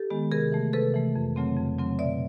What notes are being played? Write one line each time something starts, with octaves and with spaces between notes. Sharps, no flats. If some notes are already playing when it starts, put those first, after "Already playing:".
Already playing: G4 A4
D#3 G#3 B3
C3 G#4 A#4
E3 A3
C3 A4 B4
E3 A3
F2
C#3 F#3 A3 C4
F2
C#3 F#3 A3 C4
B2 D5 E5